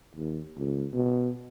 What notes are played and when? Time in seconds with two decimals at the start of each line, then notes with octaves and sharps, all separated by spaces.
0.16 D#2
0.57 C#2
0.94 B2